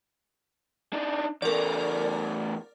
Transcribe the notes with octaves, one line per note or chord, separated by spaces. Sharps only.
D4 D#4
E2 A3 A#4 D5